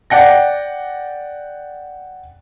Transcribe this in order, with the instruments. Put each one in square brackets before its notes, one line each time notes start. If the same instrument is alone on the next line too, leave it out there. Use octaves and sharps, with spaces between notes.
[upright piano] D5 F#5 G5 A#6